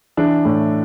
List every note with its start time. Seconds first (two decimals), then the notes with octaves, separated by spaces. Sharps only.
0.17 E3 D4
0.45 A2